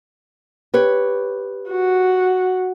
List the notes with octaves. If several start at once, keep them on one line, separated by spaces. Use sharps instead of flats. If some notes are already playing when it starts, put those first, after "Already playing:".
G4 B4 C#5
F#4